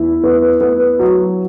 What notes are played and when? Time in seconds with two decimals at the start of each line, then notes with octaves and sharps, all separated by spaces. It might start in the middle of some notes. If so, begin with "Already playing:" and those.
Already playing: E2 E4
0.23 B3
0.61 B3
0.99 F#3